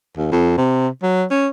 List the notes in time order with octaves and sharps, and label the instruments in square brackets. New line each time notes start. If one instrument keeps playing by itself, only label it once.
[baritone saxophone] D#2
F2
C3
F#3
C#4